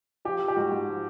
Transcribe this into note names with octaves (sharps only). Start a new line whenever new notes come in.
F3 G4
F3
G4
G#2 F#4
G#2
F3